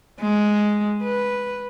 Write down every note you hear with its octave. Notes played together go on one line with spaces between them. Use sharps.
G#3
B4